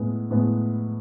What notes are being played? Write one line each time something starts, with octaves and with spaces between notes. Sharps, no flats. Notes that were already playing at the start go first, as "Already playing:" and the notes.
Already playing: A2 G#3 B3
A2 G#3 B3